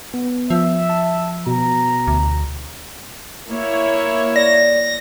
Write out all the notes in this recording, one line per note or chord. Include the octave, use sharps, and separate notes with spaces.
B3
F3 E5
A5
B2 A#5
D2
A#3 E4 C#5
D5 A#6